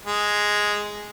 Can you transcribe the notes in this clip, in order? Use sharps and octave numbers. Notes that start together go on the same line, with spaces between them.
G#3